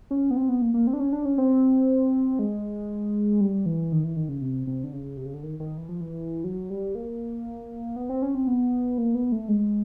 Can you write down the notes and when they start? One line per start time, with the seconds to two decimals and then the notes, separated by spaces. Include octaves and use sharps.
0.11 C#4
0.31 B3
0.37 C4
0.49 B3
0.62 A#3
0.74 A#3
0.87 C4
0.93 D4
1.00 C#4
1.13 D4
1.25 C#4
1.38 C4
2.39 G#3
3.41 G3
3.66 E3
3.92 D#3
4.04 E3
4.17 D#3
4.29 C#3
4.41 C3
4.67 C3
4.84 D3
4.93 C#3
5.17 C3
5.26 C#3
5.34 D3
5.43 D#3
5.60 D#3
5.78 E3
5.89 F3
6.01 E3
6.44 F#3
6.70 G3
6.95 A#3
7.96 B3
8.09 C4
8.22 C#4
8.35 C4
8.47 B3
8.98 A#3
9.15 B3
9.32 A3
9.48 G#3